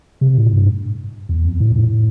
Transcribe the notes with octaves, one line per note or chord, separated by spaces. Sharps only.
C3
A2
G2
E2
F2
A2
A2